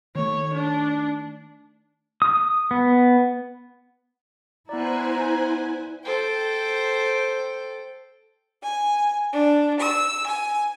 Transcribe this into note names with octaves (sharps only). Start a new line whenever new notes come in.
D#3 A3 C#5
D4
D#6
B3
B3 E4 C5 D5 G#5 A#5 F#6
A4 C5 G5
G#5
D4
E6
G#5